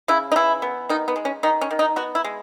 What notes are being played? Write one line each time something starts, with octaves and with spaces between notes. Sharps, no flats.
C#3 E4
D#4
E3 E4
B3
D#3 D#4
B3
G#3
C#4
D#3 D#4
C#4
D#3
D#4
B3 F#4
E4
G#3